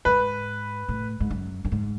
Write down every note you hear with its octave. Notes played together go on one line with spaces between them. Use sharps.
G#2 B4
A2
G#2
F#2
F#2
G#2